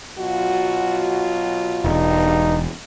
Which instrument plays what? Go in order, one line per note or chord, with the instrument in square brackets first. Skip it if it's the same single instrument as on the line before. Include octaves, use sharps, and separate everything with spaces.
[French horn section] B2 F#3 F4 [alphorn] F#4
[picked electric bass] E1 [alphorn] G2 [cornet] D#4